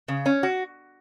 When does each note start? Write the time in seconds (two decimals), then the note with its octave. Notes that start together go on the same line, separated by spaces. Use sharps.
0.08 C#3
0.26 C#4
0.43 F#4